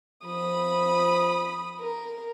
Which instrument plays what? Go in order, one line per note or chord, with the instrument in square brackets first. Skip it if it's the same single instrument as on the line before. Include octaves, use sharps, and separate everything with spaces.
[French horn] F3 [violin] B5 D#6
[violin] A#4